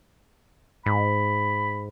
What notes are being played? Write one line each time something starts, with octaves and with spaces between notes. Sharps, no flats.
G#2 B5